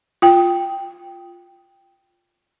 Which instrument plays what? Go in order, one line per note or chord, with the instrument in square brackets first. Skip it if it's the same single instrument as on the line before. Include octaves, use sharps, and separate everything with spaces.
[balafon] F4 G5